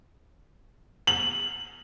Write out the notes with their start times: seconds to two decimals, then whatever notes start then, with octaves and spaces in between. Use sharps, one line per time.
1.07 F#7